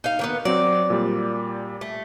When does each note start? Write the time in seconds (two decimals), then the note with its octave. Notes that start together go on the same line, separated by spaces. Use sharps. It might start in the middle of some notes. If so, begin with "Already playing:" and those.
0.04 D#4 F5
0.19 D#3 A#3 B3
0.45 F#3 C4 D5
0.90 A#2 G3
1.81 A3